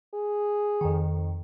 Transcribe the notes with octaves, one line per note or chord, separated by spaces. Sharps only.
G#4
F2 D#3